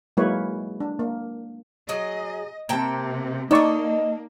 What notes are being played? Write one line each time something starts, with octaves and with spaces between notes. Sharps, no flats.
F#3 G#3 A#3 E4 B4 C#5
D4
A#3
F#3 G#4 D#5
C3 A#3 G5 A5
A#3 D#4 A4 D5 D#5 C#6